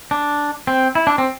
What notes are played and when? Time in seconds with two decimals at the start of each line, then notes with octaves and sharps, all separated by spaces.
0.11 D4
0.67 C4
0.95 E4
1.07 D4
1.18 C4